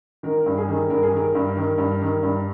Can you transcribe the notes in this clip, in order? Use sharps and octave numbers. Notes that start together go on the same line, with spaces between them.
D#3 A#4
G2
G#4
D#3
G2 A#4
G#4
D#3 A#4
G2
D#3
G2
D#3
G2